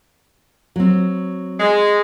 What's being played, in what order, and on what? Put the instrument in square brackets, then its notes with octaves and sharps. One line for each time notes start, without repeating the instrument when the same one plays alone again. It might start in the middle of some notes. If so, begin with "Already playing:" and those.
[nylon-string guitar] F#3 C4
[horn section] G#3